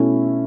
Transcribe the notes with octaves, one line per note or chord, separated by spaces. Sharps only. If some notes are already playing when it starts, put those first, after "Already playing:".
Already playing: B2 A3 C#4 E4